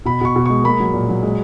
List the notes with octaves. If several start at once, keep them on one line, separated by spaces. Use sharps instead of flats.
B2 B5
B2 C#6
B2
G#3 C#6
A#3 B5
F#3
A#2
F#3
G#3